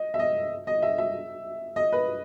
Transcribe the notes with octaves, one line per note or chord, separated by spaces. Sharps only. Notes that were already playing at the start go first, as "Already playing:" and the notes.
Already playing: D#5
E5
D#5
D#5
E5
E5
D#5
B4